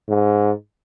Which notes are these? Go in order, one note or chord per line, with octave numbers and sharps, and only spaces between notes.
G#2